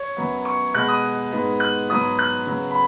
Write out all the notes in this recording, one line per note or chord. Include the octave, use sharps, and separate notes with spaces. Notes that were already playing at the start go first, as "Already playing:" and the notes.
Already playing: C#5
F#2 F#3 B3
C#6
B2 G#3 B3 F#6
D#6
G#2 G#3 B3
F#6
G#2 F#3 B3 D#6
F#6
C#3 F#3 B3
B5